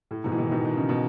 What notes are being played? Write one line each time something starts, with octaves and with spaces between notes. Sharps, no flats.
A2
G#2 B2
E3
B2 D#3
B2 D#3
D#3
C#3
B2